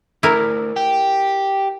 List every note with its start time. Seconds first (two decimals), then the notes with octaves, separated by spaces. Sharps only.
0.23 D2 E4 A#4
0.76 G4